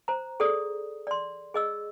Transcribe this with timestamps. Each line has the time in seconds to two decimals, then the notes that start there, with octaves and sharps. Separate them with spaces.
0.08 C5 A#5
0.40 G#4 A4 D5 D#6
1.07 D5 C6
1.54 G#4 D#5 E6